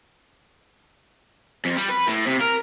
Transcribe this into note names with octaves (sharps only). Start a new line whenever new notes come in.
F2
G3
B4
A2
C3
A#4